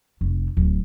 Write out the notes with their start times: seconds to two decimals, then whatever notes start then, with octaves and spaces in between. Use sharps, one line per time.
0.21 F1
0.57 D1